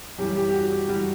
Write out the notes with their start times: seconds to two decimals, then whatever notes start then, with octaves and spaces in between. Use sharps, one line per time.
0.18 F#2 E3 G3 G4
0.36 G4
0.49 G4
0.54 F#4
0.71 G4
0.89 E3 G3 F#4